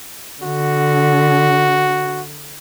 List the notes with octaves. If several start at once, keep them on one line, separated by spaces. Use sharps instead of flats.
D3 F#4